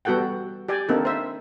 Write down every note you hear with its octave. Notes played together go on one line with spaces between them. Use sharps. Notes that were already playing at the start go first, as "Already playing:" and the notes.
G3 B3 F#4 A4 F#5 G5
G4 D5 G5 G#5
A#3 C4 D4 D#4 A4
C5 E5